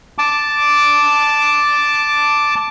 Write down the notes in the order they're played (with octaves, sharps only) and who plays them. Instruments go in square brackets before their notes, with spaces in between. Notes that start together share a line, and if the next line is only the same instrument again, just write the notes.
[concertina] A5 D6